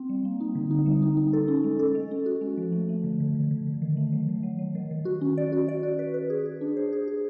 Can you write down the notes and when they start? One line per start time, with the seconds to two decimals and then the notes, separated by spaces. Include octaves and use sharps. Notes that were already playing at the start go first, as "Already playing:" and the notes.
Already playing: C4
0.09 G3
0.25 A#3
0.40 D#4
0.55 D3
0.71 D#4
0.86 G3
1.02 D#4
1.17 D#4
1.33 A4
1.48 C#4
1.64 G#3
1.79 A4
1.95 G#3
2.11 C#4
2.26 F#4
2.41 G#3
2.57 F3
2.72 A3
2.89 A3
3.04 D3
3.20 D3
3.35 D3
3.51 D3
3.67 D3
3.82 D#3
3.97 A3
4.12 F#3
4.28 D#3
4.43 F#3
4.59 F#3
4.75 D#3
4.91 D#3
5.05 F#4
5.21 C#4
5.37 D5
5.52 F#4
5.68 D5
5.83 F#4
5.99 B4
6.14 B4
6.30 G#4
6.45 G#4
6.61 D4
6.77 C5
6.93 G#4
7.08 G#4